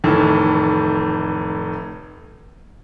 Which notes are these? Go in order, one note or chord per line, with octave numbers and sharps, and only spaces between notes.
F1 A2 D#3 E3